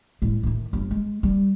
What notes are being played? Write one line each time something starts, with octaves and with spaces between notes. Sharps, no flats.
A2 G#3
A2 D#3
G1
G#3
G3